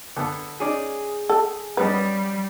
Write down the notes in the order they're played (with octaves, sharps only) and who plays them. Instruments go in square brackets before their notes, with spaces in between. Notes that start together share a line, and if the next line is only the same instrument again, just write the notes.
[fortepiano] D3 B3 A4
[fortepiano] C#4 D#4 D5 [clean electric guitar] G#4
[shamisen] A4
[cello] G3 [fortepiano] B3 C#4 D#5 [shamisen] B4